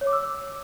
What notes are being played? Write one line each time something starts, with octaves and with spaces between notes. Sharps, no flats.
C#5
D6
E6